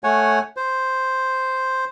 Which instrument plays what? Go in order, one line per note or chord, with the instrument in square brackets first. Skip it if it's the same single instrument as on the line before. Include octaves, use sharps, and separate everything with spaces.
[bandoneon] A3 C#5 F#5 G#5
C5